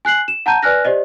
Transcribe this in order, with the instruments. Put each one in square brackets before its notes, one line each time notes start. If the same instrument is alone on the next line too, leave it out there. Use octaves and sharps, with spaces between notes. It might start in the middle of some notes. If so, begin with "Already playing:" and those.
[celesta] G#5 F#6 C7 F#7
E7
F#5 A5 A#5 G6 D#7
B4 D5 G#5 F6 F#6 A#6
G4 C5 D5 D#5